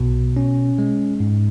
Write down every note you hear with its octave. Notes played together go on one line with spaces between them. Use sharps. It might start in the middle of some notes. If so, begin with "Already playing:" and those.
Already playing: B1 B2
C#4
G#3
G#2